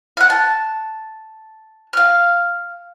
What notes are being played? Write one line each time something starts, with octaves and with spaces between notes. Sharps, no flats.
F5 F#5
A5
F5 F6